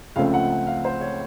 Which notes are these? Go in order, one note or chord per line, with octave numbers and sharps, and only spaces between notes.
C#2 C#3 F3 A3 C4 F5
F#5
F#5
F5
C5
C#5